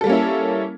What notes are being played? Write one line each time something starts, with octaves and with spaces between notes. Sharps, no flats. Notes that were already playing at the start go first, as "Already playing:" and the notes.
G3 A#3 C#4 E4 A4